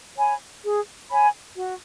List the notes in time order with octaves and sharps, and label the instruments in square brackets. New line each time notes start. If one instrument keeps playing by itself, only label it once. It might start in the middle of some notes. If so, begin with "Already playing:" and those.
[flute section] C#5 G#5 B5
G#4
C#5 G#5 B5
F#4